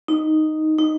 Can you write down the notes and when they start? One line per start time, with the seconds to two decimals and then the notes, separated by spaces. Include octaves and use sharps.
0.08 D#4
0.78 D#4